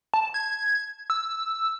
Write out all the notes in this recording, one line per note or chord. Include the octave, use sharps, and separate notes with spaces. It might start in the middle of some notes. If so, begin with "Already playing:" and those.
A5
G#6
E6